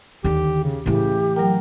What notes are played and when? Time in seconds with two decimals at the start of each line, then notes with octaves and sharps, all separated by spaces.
0.24 D#2 D3 G4
0.63 C#3
0.86 A2 C#3 E3 G4
1.36 F#3 A#4 G5